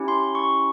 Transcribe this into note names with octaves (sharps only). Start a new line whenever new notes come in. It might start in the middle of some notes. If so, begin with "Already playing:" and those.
Already playing: C#4 E4 G4
C6
C#6